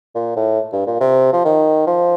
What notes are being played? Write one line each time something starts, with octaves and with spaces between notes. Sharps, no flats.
A#2
A2
G2
A#2
C3
F3
D#3
F3